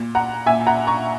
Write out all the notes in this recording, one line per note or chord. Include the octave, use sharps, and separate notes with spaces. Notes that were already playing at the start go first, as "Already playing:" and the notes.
Already playing: A#2
F#5 A#5
A#2 E5 G#5
F#5 A#5
A#5 C#6